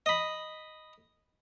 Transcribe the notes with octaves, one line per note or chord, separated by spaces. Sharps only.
D#5 B5